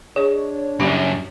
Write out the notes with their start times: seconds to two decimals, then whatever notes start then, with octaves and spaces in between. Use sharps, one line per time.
0.16 D4 G#4 C#5 D#5
0.80 F#2 C#3 G3 G4 B5